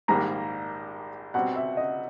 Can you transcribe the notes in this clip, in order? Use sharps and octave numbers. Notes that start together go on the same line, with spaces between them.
A#1 G#2 D#3 G3 A#3 A#5
B2 G3 C4 F#5
E5
D#5